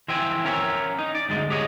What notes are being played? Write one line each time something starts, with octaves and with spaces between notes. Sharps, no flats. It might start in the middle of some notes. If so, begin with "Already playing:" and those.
E3 C5 E5 G5 G#5
C#4 A#4 C#5 E5
D#4
D5
D2 G#2 G#3
G4 G#4 C#5 D#5